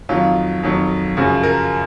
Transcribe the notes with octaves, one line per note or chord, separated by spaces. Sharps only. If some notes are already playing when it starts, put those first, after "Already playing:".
F2 D#3 F#3 F4
F2 D#3 F#3
F#2 C#3 F3 F#4
A#4